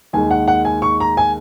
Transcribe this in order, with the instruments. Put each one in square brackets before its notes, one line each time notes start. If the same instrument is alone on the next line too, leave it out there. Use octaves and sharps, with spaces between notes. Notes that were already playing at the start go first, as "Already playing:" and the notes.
[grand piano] D#2 D#3 G#3 G#5
F#5
F#5
G#5
C#6
A#5
G#5